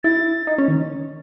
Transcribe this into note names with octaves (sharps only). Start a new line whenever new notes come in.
E4 A6
D#4
C#4
D#3